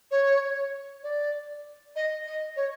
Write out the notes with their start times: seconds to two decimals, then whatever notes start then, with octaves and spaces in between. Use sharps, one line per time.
0.11 C#5
1.03 D5
1.95 D#5
2.27 D#5
2.56 C#5